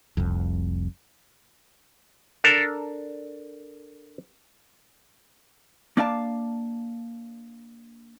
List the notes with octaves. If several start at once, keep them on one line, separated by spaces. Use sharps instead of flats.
F1 C2 F2
D4 A4 A#4
A#3 D4 D5 F5 G5 A5